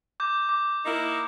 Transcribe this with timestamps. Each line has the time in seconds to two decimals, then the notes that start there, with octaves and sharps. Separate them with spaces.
0.20 D6 G6
0.49 D6
0.85 A#3 D#4 E4